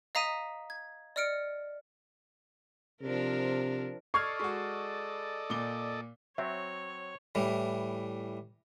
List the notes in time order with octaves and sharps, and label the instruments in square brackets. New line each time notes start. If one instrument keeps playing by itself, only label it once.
[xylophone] D#5 F5 A#5 D#6 B6 D#7
G#6
D5 D#5 F6 C#7 D7
[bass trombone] C3 [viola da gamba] F3 D4 A#4
[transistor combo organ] A4 D5 D#5 [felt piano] C#6 [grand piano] F6 G#6 C7
[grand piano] G#3 F#4
A#2 D6 G7
[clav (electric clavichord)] F#3 C4 [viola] C#5 [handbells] E5
[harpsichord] A2 E3 G3